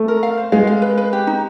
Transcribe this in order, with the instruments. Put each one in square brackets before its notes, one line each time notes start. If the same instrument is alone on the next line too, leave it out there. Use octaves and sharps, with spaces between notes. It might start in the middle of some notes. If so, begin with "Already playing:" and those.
Already playing: [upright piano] A3
[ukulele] A#4
F5
C5
[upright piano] G#3 [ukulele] F5
[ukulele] F5
B4
B4
G4
D#4